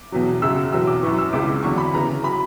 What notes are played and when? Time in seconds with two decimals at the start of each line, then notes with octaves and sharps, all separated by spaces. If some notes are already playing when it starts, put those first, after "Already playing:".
Already playing: D6
0.12 E2 B2 F#3
0.42 F#2 C#3 F#3 E6
0.72 E2 B2 F#3 E6
0.87 D6
1.03 F#2 E3 C#6
1.18 E6
1.33 C#2 C#3 E3 D6
1.63 E2 D3 F#3 C#6
1.78 B5
1.94 E2 C#3 E3 A#5
2.24 F#3 B5